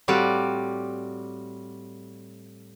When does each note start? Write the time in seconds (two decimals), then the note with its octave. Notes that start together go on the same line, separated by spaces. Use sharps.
0.08 A2 G3 C4 F#4 D5 F5